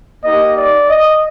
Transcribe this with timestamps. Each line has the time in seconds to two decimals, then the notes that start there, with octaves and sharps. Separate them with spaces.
0.23 A#3 D#4 G4 D#5
0.56 D5
0.89 D#5